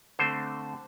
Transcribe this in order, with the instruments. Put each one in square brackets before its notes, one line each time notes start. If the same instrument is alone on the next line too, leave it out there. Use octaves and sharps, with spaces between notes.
[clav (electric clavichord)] D3 A3 C4 C5